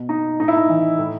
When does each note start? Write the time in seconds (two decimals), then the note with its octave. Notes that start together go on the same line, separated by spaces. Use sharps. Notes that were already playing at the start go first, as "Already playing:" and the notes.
Already playing: B2
0.09 D#4
0.39 A2 D#4
0.48 E4
0.57 D#4
0.69 E3
0.99 A2